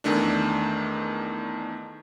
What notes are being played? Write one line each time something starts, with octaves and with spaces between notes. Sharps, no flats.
E2 D#3 A3 D4